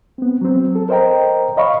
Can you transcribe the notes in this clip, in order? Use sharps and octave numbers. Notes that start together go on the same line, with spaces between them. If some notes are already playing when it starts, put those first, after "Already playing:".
B3 C4
F#3 C4
A4
A#4 C5 D#5 G5 A#5
C#5 D#5 F5 B5 C#6